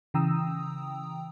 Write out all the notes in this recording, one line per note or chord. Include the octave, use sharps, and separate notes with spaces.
C#3 E3 G5 A#5 D#6 E6